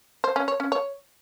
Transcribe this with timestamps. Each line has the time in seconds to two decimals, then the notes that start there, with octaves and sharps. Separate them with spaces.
0.24 C5
0.36 C#4
0.48 C#5
0.60 C#4
0.72 C#5